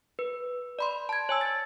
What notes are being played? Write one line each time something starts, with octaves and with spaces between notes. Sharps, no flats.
B4
D5 B5 C6
A5 G#6
C#5 G#5 E6
A6